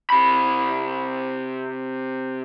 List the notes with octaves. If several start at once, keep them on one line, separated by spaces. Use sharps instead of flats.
C3 B5